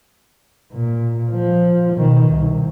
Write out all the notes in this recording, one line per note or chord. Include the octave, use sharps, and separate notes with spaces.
A#2
F3
B2 D#3
C2